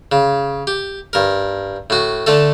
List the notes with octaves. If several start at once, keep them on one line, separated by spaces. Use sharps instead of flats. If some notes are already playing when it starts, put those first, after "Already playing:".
C#3
G4
G2 A#4
A2 F#4
D3 A3 A4